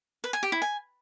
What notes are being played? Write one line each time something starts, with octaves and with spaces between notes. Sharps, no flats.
B4
G#5
G4
E4
G#5